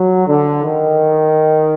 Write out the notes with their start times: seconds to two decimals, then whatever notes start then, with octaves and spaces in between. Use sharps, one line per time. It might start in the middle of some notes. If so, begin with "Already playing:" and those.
Already playing: F#3
0.28 D3
0.63 D#3